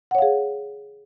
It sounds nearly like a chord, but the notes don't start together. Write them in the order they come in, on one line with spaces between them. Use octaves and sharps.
F#5 C#5 F5 G#4